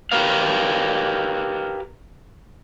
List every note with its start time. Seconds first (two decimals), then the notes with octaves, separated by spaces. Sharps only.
0.12 G4 A#4 B4 F5